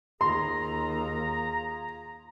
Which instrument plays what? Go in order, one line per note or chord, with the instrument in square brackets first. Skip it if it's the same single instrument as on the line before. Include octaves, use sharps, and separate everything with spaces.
[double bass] D#2 [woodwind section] F4 G#4 A#5 [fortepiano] C6